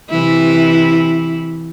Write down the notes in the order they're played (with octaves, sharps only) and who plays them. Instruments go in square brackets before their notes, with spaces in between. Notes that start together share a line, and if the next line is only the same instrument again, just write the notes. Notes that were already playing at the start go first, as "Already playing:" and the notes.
[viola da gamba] C3 E3 E4